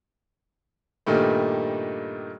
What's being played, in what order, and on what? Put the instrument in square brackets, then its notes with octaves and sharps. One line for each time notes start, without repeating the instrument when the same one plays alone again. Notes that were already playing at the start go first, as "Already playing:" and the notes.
[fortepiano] G2 A#2 D#3 G3 A3